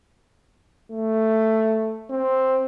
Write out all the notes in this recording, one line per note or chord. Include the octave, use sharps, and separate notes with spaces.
A3
C4